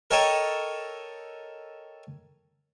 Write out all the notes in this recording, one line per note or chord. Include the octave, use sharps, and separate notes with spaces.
A4 A#4 C#5 D#5 G5 A5